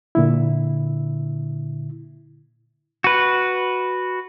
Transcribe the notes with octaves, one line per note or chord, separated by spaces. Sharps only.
A#2 D3 E4
F#4 B4